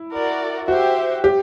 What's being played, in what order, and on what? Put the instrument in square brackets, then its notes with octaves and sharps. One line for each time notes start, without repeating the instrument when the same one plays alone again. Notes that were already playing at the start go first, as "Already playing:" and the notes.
Already playing: [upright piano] E4
[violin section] F#4 A#4 D5
[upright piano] F#4 [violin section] G4 C5 E5
[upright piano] G4